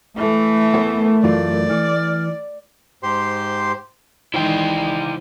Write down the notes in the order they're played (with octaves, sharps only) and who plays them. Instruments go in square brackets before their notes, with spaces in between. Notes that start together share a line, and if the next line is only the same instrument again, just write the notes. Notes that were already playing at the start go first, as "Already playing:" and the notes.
[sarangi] E3 [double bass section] A3
[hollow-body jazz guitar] B3 C#5 [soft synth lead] A#4
[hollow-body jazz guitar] F#2 E3 F4 [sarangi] D5
[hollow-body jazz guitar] E3 [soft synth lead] F6
[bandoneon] G#2 G4 C5 C6
[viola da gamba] D#3 E3 G#3 [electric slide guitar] E4 C5 G5